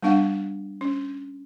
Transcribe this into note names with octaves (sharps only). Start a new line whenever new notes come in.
G3 B3 D4 F5 F#5
C#4